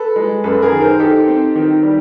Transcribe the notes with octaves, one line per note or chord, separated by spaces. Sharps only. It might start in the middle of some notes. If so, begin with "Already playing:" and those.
Already playing: A4 B4
G#3
F#2 A4 B4
G#4 A#4
D#3
A#4 C5
D#4 G4 A4
C4
D#3
G3